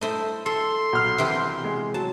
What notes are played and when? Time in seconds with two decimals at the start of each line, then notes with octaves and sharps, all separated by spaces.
0.01 A3 E4 C5 D#5
0.46 A4 C6
0.93 B1 F6
1.18 C3 E3 G4
1.64 G#3
1.94 F#3 A5